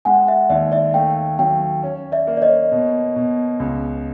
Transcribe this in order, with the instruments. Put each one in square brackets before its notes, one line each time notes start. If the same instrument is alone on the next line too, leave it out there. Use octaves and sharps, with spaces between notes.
[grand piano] G#3 [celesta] F#5 G#5
[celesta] E5 F#5
[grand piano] D#2 [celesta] D5 E5
[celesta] D5 E5
[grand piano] A3 [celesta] F5 G5
[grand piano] F#3 [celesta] F5 G5
[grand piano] C#4
[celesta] D5 E5
[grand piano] A#3
[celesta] D5
C#5 D#5
[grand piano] B2
B2
C#2